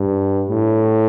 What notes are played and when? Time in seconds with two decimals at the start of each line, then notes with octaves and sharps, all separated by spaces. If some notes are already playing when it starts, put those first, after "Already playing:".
Already playing: G2
0.49 A2